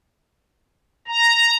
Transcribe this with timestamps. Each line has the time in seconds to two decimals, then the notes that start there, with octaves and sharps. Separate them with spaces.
1.08 A#5